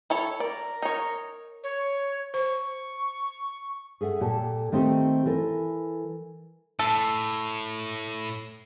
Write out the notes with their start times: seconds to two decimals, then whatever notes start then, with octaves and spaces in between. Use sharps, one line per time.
0.10 E4 A4 C#5
0.40 A#4 D5
0.82 D#4 C#5
1.64 C#5
2.34 C5 C#6
4.01 G#4 A4 E5 F#5
4.21 A#2 G4 A4 A5
4.72 D#3 A3 C4 D#4 G4
5.26 E3 A4 A#4
6.79 A2 A4